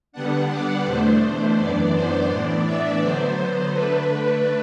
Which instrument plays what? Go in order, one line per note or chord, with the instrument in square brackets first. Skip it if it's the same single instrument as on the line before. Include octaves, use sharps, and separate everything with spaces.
[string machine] D3 G3 B3 D4 F#5
D5
E2 B2 A3 D4 C5
F#2 E3 B3 D4 D5
C5
A2 E3 B3 D4 D5
E5
D3 F#3 B3 C5
D3 A3 D4 B4